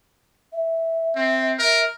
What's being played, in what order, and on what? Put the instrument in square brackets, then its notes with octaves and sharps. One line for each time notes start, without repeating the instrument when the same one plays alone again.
[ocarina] E5
[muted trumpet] C4
[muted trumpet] A#4 [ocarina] E5